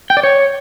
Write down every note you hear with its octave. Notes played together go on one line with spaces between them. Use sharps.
G5
D5
C#5